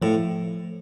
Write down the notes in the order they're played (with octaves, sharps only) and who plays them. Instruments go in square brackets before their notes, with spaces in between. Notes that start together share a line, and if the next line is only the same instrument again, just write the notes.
[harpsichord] A2 [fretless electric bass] F3